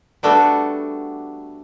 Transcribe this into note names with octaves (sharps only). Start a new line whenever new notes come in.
G3 A3 B3 D4 F#4 A4